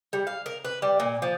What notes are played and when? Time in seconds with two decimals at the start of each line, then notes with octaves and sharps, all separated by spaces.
0.13 G3
0.27 F5
0.46 A#4
0.65 B4
0.82 G3
1.00 A#2
1.22 F3